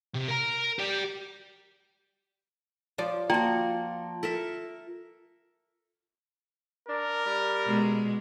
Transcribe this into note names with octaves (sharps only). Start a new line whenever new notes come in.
C3
A#4 A#5
G4 D5
F3 D5
A#3 F4 F#4 G5 A5 C6
A4 A#4 E5
D4 A#4
G3
B2 G#3